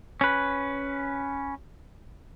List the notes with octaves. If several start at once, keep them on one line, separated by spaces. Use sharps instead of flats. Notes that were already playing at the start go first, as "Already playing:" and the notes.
C#4 B4